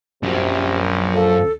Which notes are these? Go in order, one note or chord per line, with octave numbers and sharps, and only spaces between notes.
A#1 F#2 C3
F3 A4